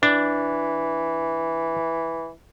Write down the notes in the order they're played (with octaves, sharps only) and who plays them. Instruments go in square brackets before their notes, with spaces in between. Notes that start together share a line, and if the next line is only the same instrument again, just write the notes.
[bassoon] E3 [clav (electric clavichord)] D4